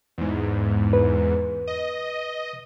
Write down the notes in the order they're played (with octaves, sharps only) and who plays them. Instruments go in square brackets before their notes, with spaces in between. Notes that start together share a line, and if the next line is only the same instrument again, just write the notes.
[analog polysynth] E2 G#2
[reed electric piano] B4
[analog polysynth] D#5